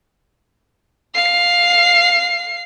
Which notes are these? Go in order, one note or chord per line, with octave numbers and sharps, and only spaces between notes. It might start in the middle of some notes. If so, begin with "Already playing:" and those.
F5 C7